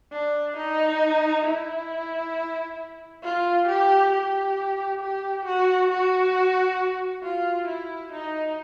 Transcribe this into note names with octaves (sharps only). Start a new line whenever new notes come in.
D4
D#4
E4
F4
G4
G4
G4
F#4
F#4
F4
E4
D#4